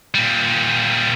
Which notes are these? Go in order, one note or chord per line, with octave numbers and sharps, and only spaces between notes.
A#2 G3